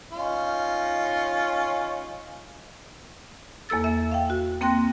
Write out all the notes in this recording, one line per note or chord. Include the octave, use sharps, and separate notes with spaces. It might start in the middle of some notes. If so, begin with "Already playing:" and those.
C#4 D#4 F4
E2 A#3 A4 E6 A6
E5
F5 G5
F#4
A#3 C4 G5 C6 F#6 A#6